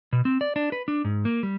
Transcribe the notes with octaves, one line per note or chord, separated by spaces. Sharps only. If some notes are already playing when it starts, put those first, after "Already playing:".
B2
C4
D5
D4
B4
D4
G#2
A#3
G3